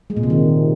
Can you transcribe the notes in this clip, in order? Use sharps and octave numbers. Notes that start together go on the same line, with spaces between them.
G#3
A#2
C3
D#3